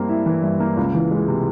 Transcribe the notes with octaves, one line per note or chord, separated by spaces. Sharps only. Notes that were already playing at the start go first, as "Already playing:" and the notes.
Already playing: G2 A#3 C4
E4
E3
G2
A#3
C#2
E3
G#3
C3